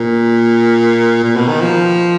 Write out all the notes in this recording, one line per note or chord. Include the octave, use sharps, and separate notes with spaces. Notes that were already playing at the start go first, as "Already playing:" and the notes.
Already playing: A#2
A#2
B2
D#3
F3